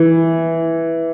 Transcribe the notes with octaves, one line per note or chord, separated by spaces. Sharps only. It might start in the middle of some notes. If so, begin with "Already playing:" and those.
Already playing: E3